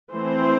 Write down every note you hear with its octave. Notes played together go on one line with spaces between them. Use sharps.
E3 A3 C4 C5